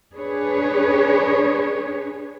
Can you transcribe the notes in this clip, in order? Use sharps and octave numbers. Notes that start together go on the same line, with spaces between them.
D4 G#4 B4 C#5